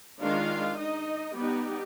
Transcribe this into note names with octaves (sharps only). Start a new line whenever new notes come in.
D#3 G#3 D4 F4 F5
D#4 D#5
G3 B3 D#4 G4